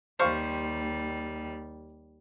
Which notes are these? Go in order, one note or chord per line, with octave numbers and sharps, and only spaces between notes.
D#2 G3 C5 F5 C#6